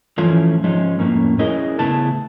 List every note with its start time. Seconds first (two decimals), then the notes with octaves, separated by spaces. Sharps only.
0.18 E3 F3 A3 C#4 E4 F4
0.64 F3 G#3 C#4 D#4 C#5
0.99 F2 A2 C3 A#3 C#4
1.39 C#4 E4 G#4 A#4 D#5
1.79 C#3 A3 B3 E4 G#4 A5